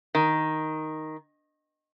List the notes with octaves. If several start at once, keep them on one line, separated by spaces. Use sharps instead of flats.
D#3